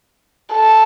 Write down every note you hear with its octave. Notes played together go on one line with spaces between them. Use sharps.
A4